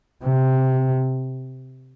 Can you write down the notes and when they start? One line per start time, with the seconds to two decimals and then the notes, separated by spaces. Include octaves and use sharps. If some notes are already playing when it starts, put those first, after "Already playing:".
0.24 C3